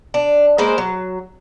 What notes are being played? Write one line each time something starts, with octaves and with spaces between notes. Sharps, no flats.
D4
G#3 A#3 B4 C5
F#3